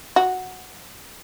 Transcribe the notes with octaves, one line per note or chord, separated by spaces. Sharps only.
F#4